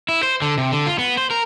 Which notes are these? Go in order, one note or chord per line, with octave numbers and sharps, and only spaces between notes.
E4
C5
D3
C3
D3
F4
B3
C5
A#4